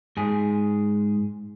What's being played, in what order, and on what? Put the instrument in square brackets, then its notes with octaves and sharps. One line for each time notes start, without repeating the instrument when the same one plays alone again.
[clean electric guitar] G#2 G#4